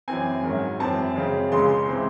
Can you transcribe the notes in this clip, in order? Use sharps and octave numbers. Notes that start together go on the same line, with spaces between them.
F#2 E3 C4 G#5
G#2 D#3 F#3 C#4
F#2 E3 C4 A5
F#2 C#3 G#3 C4
C#2 C#3 G#3 C6
C3 E3 C4